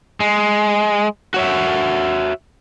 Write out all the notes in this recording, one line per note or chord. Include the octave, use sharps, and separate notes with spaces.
G#3
F#4 C#5 E5